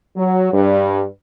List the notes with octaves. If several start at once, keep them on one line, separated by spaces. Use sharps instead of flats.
F#3
G2